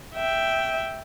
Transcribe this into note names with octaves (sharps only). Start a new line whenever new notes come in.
E5 G5